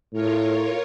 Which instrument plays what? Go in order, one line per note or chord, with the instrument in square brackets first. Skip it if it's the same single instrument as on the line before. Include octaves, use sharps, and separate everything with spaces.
[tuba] A2 [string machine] F4 A#4 C#5